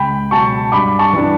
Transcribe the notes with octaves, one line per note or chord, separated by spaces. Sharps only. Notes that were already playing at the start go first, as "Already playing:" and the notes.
Already playing: C#2 G5 B5
B2 F#3 A5 C#6
G2 B5 D6
A5 C#6
E3 G3 D4